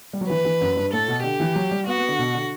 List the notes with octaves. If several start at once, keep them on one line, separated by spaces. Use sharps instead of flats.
G3
F#3
E3 B4
E3
F#2
G2
A2 A4
B2
D3 G4
E3
F#3
G3
B3 F#4
B3
D3
B2
D3